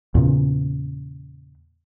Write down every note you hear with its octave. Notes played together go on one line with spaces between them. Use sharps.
E2 A#2 C#3